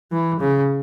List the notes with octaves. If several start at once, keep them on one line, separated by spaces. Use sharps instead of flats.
E3
C#3